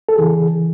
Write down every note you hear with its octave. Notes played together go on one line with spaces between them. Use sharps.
A4
C#3 E3 G#4